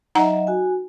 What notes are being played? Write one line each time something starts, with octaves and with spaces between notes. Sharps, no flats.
F#3 D#4 D#5 E5 F#5 A#5
F#4 G#5